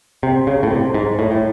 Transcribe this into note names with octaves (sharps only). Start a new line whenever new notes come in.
C3
C#3
A2
C3
G#2
A2
A2